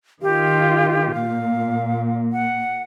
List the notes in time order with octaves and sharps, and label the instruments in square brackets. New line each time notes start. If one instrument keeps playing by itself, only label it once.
[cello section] D#3 F4 [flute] G4
[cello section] A#2 [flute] F5
[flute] F#5